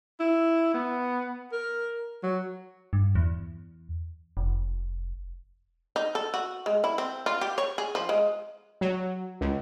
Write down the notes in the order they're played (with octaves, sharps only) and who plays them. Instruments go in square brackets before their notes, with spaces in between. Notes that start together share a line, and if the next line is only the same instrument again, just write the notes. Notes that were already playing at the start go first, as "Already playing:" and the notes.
[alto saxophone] E4
B3
A#4
F#3
[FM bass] G2
E2
F1
[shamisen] D#4
A4
F#4
G#3
E4
C4
F4
G4
C#5
G#4
F3
G#3
[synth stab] F#3
C#2